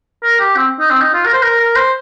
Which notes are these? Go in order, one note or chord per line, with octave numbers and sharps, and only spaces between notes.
A#4
G4
C4
D#4
C4
D#4
F4
A#4
C5
A#4
A#4
C5